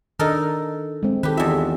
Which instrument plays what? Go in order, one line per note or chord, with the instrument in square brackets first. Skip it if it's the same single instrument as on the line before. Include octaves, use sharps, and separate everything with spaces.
[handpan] D#3 D4 D#5 [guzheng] D#4 A4 A#4
[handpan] G#3 C4
[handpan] D#3 A4 [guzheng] G4 B4
[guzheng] E2 E5 [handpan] F4 G#4 D#5